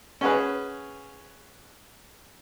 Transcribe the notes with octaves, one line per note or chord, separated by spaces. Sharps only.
C#4 F#4 G#4 B4